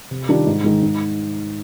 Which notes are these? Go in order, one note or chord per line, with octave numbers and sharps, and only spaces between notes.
C3
D#3 G3 D4 F4
G#2
D#3 G#3
G#2